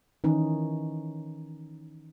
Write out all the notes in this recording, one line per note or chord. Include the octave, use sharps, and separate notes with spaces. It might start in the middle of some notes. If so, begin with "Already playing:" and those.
D#3 E3 C#4 D#4